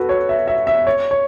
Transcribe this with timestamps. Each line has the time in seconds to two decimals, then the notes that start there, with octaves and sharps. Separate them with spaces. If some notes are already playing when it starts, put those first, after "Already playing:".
Already playing: F#4 A4 B4
0.09 C#5
0.29 E5
0.48 E5
0.67 E5
0.87 C#5
1.11 C#5